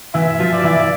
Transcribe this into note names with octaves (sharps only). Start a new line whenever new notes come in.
E3 E4 E5
F3 F4
D5
E3 E4